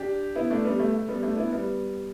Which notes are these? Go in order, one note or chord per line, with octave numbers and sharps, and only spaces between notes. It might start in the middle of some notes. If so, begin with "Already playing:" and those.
Already playing: D4 G4
B3 E4
A3 D4
G3 B3
A3
A3
G3 B3
A3 D4
B3 E4
G3 B3